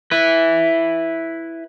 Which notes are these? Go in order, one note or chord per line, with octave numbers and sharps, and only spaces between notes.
E4 B4